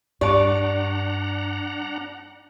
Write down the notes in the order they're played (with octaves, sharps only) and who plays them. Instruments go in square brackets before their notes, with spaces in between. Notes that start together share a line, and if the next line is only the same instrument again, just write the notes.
[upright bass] G2 [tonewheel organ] D4 F#5 A#5 [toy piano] G4 A5 C#6 [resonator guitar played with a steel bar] D5